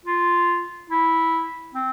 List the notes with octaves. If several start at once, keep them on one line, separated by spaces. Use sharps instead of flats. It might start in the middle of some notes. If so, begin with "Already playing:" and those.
F4
E4
C4